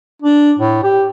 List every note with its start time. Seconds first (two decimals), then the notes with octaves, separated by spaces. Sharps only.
0.22 D4
0.59 A2
0.83 G4